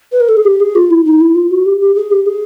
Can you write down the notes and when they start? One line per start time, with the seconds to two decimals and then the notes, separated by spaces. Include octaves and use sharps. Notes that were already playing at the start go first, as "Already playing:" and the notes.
0.12 B4
0.20 A#4
0.28 A4
0.37 G#4
0.45 G4
0.60 G#4
0.75 F4
0.91 E4
1.05 D#4
1.21 E4
1.35 F4
1.51 F#4
1.66 G4
1.81 G4
1.96 G#4
2.11 G4
2.26 G#4